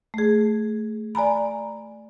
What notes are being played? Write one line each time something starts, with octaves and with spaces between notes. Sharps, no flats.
A3 G#4
D5 G#5 A#5 B5